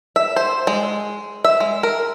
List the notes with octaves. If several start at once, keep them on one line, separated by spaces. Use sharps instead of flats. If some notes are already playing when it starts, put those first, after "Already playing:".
E5
C5
G#3
E5
G#3
A#4